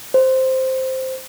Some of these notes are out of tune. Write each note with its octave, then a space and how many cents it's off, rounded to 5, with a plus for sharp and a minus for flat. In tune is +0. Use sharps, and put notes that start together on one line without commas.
C5 +0